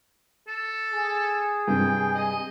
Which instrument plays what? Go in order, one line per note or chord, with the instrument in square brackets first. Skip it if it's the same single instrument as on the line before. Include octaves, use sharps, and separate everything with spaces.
[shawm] A4
[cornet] G#4
[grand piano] G2 C3 [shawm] G5
[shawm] D#5